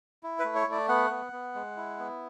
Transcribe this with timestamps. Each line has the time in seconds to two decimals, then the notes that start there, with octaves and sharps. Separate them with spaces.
0.23 E4
0.39 B4
0.45 A3
0.55 C#5
0.67 A3 D5
0.88 B3 F#5
1.10 B3
1.32 B3
1.55 G#3
1.77 E4
1.99 B3